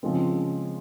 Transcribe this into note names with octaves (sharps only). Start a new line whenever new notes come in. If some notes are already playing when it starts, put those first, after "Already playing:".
C#3 F3 G#3 C4